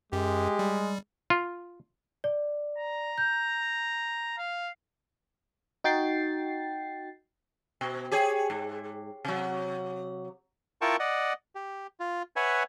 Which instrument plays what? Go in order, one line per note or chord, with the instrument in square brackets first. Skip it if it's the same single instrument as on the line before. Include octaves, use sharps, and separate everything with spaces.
[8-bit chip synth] F#2 [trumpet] G#3 [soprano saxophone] G4
[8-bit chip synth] G3
[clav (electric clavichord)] F4
[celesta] D5
[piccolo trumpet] A#5
[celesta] G6
[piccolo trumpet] F5
[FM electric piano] D#4 F#4 G5 A6 C7
[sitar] B2
G4 G#4 C#5
G#2
C3 F#3
[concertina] E4 F4 A#4 G5 A5 C#6
D5 D#5 F#5
G4
F4
B4 C#5 E5 F#5 G#5